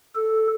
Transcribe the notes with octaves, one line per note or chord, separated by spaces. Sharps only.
A4